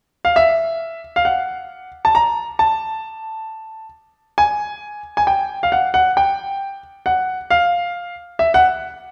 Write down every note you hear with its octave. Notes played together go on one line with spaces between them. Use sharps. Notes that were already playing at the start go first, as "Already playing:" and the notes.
F5
E5
F5
F#5
A5
A#5
A5
G#5
G#5
G5
F5
F#5
F#5
G5
F#5
F5
E5
F#5